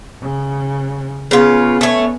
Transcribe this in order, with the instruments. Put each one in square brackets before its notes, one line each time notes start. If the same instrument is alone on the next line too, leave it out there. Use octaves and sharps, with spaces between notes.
[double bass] C#3
[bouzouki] C#3 F4 [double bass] B3 C#4
[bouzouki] A3 C#5